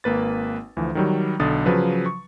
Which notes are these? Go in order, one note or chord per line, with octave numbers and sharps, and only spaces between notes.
G#1 A#3 B4 A6
D2 E3 F3
D#3 F#3 G3
B1 D3 D#6 A6
C#3 F3 F#3 B4
C#6